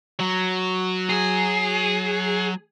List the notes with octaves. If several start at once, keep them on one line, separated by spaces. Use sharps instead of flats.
F#3
G#4